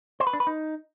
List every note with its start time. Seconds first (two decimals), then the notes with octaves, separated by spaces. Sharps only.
0.20 C5
0.27 B4
0.33 D4
0.40 B4
0.47 D#4